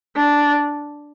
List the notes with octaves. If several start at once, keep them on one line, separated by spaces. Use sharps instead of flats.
D4